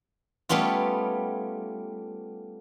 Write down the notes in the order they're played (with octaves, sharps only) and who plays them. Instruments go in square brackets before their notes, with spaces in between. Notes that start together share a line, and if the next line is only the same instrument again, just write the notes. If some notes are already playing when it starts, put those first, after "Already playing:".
[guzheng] G3 A3 B3 C#4 F4